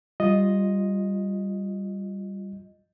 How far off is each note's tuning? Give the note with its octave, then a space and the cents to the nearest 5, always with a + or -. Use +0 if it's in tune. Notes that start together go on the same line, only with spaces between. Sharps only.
G3 +0 F4 +0 D#5 +0